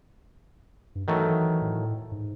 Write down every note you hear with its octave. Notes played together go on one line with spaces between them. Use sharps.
G2
D#3 E3 F#3 A3
A2
G#2